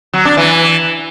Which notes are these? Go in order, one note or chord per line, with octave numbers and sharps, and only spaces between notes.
F#3
D4
E3